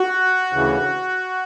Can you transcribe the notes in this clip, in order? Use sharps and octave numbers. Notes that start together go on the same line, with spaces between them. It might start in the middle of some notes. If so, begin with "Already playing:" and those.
Already playing: F#4
D2 C#3 E3